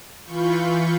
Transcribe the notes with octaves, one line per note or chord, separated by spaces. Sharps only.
E3 F4 B5 C#6 G6